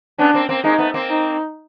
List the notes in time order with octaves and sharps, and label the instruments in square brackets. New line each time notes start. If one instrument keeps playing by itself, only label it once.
[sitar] B3 C#4 [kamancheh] D4
[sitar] A#3 C4
A#3 C4
[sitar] G#3 A#3 [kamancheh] D#4
[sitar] A3 B3
A#3 C4
[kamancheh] D#4